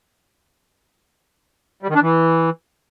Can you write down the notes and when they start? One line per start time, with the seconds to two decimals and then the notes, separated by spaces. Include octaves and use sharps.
1.83 G3
1.89 D#3
1.96 D4
2.02 E3